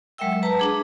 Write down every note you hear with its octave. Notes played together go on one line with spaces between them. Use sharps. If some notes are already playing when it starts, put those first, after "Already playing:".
F#3 G#3 A#4 E5 G5 E6
B4 A5 A#5
D4 G#4